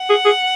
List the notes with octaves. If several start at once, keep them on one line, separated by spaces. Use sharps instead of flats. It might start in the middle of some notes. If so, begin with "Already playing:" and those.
Already playing: F#5
G#4
G#4